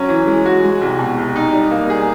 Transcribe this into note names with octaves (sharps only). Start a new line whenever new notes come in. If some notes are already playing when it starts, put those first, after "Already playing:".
Already playing: F#3 C#4
E3
G#3
F#4
G#3
C2
B2
C2
D#4
G3
A#3
G#4